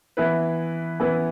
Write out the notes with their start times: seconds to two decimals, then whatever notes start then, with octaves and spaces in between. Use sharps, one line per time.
0.17 E3 B3 E4 B4
1.00 E3 B3 E4 B4